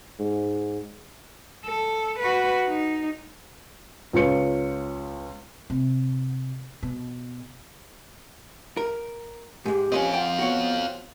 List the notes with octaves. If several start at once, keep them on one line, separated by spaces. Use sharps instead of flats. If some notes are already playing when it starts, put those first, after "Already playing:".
G#2
A4
F#4 B4
D#4
C#2 F4 B4 C#5 C#7
C3
B2
A#4
G#2 G#3 G4
C4 C#4 F4 B4 D#5
F2 F#5 G5
B3 F#4 C#5